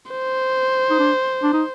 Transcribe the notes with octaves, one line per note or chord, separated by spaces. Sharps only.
C5
D#4
D4
D4
D#4